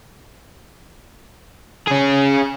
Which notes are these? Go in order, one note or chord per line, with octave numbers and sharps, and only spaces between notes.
C#4 G#4